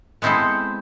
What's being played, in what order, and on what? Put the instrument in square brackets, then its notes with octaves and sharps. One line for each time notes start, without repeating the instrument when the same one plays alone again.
[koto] G#3 B3 C4 E4 G#4 A4